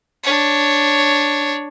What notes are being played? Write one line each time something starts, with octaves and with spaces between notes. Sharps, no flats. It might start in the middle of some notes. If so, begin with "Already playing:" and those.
D4 C#5